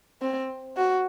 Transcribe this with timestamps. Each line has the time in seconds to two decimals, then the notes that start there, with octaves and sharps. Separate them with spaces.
0.21 C4
0.77 F#4